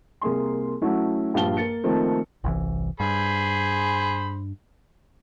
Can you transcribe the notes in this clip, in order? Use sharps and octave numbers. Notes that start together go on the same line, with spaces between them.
C2 A#3 G#4 C6
F#3 A3 C#4 E4 F#4
A#1 G2 F3 F5 A5 G7
A#3 A6 C#7
D#3 F3 A3 A#3 C4
G1 C2 E3
G2 G#4 C5 B5